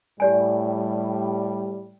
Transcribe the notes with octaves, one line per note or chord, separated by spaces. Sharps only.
A2 G3 G4 D5 G#5